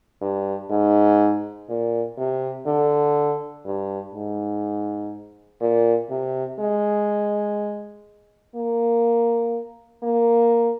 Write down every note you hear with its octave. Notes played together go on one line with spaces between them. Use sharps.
G2
G#2
A#2
C3
D3
G2
G#2
A#2
C3
G#3
A#3
A#3